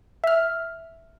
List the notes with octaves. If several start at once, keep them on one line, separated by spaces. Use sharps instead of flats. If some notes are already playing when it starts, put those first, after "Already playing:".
E5 F6